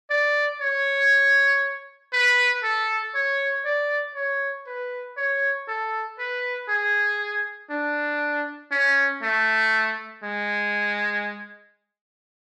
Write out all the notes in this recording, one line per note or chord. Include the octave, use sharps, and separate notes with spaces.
D5
C#5
B4
A4
C#5
D5
C#5
B4
C#5
A4
B4
G#4
D4
C#4
A3
G#3